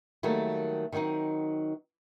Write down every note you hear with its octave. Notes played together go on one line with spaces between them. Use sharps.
D#3 F#3 G3 A3 A#3
D#3 F#3 G3 C4 D#4